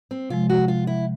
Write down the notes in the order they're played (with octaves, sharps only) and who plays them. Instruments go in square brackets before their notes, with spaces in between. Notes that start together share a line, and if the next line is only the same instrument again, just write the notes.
[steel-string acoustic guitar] C4
[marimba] C3 F3 G#3 [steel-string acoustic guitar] F4
[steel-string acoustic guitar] F#4
F4
E4